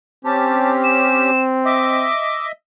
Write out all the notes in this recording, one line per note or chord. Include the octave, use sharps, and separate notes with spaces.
C4 C#4 G4 A5
E7
D#5 E5 D6